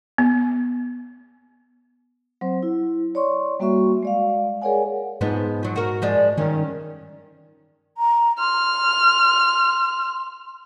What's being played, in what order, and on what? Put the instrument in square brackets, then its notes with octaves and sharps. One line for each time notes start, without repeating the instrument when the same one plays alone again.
[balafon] B3
[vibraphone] F#3 C4 C5
E4
C#5 D5 C6 C#6
G3 A#3 F#4 E5 C#6
G#3 D5 F5
G#4 A#4 C#5 D5 F#5 G#5
[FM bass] G#2 [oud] F3 G#3 B3
[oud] F3 F#3
F#4 A#4
F3 G#3 D4
[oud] G2 C#4 [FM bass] D#3
[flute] A#5
[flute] C6 [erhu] F6